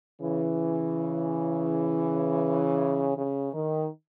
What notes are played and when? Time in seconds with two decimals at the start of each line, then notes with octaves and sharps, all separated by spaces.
0.22 C#3 E3
3.18 C#3
3.54 D#3